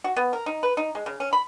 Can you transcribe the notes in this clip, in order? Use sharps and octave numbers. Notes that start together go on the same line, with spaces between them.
F#4
B3
A#4
D#4
B4
D#4
G#3
C#3
C#4
B5